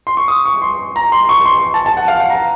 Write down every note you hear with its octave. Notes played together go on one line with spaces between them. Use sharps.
C6
C#6
D#6
C#6
C6
A#5
C6
C#6
C6
A5
A5
F#5
F5
F#5
A#5